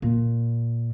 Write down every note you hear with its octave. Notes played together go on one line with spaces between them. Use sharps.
A#2